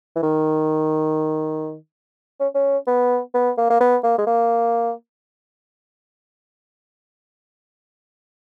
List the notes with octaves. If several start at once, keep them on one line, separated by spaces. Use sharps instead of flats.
E3
D#3
C#4
C#4
B3
B3
A#3
A#3
B3
A#3
G#3
A#3